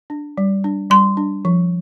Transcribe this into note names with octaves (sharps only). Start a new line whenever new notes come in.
D4
G3
D4
G3 C6
D4
F3